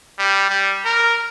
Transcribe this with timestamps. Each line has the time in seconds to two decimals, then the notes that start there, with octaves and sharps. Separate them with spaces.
0.19 G3
0.50 G3
0.85 A#4